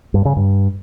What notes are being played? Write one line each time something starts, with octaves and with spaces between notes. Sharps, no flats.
G2
C#3
G2